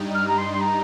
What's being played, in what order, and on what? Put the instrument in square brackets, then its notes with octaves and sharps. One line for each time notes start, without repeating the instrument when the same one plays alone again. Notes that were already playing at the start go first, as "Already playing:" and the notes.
Already playing: [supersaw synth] G2 G3 D#4
[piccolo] F6
A#5
C6
C6
A#5